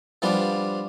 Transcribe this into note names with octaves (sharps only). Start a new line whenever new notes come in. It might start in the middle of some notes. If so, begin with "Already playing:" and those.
F3 G3 B3 D4 F4 D5